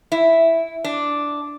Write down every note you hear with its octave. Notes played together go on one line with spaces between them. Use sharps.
E4
D4